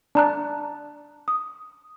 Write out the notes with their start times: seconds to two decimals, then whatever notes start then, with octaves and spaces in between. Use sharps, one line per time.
0.15 D4 A5 A#5 F#6
1.28 D#6